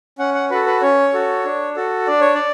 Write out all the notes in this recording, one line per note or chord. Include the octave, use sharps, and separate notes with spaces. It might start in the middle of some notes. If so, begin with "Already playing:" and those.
C#4 F#5
F#5
F#4 A4 B4
B4
C#4 C#5
F#4 A4
D4
F#4 A4
D4 D5
C#5
D5